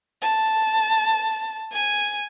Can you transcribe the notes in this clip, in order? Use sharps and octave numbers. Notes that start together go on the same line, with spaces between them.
A5
G#5